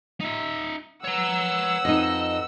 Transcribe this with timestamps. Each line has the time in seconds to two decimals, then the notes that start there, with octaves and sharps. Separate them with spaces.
0.20 D#4 E5
1.05 B4 C#5 F#5 A#5 E6
1.85 F2 D#4 D#5